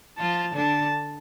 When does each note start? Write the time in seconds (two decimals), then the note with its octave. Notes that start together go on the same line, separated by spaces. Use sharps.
0.18 F3 F4 A5
0.55 D3 D4 A5